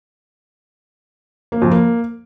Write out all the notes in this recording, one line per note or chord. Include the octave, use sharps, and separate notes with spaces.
A#3
F2
A#3